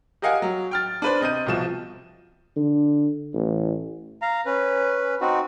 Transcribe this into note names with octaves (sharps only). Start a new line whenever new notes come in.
G4 A#4 D#5 F5 F#5 G#5
F#3
G5 F6 A6
D4 B4 C5
C3 D#5 G6 D#7
C2 B2 F3 E7
D3
A1
F5 A#5
C#4 B4
C4 D#4 F#4